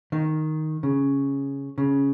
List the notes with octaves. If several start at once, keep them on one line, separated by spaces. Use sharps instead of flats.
D#3
C#3
C#3